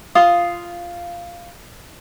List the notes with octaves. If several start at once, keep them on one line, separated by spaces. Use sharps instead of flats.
F4 F5 C6 D#6